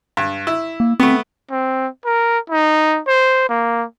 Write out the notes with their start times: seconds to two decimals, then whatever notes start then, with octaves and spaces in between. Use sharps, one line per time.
0.17 G2
0.47 E4
0.80 A#3
1.00 A3 B3 C4
1.51 C4
2.05 A#4
2.50 D#4
3.07 C5
3.49 A#3